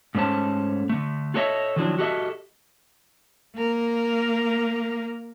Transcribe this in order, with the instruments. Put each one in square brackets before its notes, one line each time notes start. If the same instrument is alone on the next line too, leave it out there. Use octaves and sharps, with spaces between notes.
[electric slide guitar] G#2 A3 C#4 C5 A5
D3 A3
F4 F#4 A4 C#5 D#5 E5
D#3 F3 F#3 D4 E4
F#4 G4 A4 D#5 E5
[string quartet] A#3 A#4